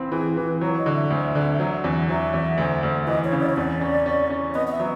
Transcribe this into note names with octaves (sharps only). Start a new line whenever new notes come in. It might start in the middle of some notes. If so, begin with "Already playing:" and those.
Already playing: C#2 E3 C4
E3 G#4
E3 B4
F#3 C#5
D#5
D3
E5
D2
D3
F#3
E2
F#3 E5
E2
D2
D2
E3 D#5
C#5
C#3
D5
C#5
E2 D5
C#4
C#4
C#4
B3 D#5
D#5
E5
F#3